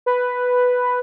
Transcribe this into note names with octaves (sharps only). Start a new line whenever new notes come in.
B4